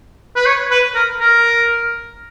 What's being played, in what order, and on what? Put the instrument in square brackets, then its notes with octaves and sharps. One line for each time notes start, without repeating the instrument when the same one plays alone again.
[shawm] B4
C#5
B4
A#4
A#4